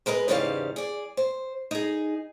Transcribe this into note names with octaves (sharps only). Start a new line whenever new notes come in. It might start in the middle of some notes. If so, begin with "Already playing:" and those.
G#3 A#4 B4 D#5
E2 G#2 C#3 G3 C#4 F5
G#4 D5
C5
D#4 G#4